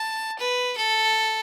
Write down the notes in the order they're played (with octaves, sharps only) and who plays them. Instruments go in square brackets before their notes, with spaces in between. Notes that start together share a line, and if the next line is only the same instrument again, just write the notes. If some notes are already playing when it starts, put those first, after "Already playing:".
Already playing: [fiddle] A5
B4
A4